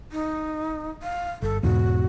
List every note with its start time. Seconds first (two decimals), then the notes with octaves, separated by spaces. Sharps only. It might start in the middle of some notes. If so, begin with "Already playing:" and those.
0.12 D#4
1.03 F5
1.42 G1 A4
1.63 E2 G#2 B2 F#4